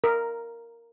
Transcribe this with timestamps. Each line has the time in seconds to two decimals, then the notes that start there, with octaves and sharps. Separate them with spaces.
0.04 A#4